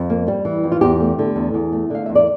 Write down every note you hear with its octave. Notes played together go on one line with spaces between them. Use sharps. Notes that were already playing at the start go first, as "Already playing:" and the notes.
Already playing: F2
A#3
G3
E3
F2
F4
E2 G4
A3
D3
E2
E2
A3
D3 F5
E2 E5
D5